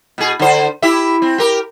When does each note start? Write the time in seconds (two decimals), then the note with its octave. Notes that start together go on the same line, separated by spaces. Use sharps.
0.18 B2 G#4
0.39 D3 C5
0.82 E4 G4 E5
1.22 C4
1.38 G4 A#4